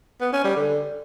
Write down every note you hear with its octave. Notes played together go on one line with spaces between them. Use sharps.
B3
C#4
G3
D3